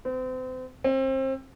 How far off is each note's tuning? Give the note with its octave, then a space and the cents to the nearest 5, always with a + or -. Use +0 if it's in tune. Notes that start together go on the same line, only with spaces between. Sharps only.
C4 -35
C4 +30